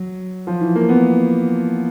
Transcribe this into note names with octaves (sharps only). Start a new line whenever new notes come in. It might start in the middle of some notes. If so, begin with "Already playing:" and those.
Already playing: F#3
F3
E3
A#3
B3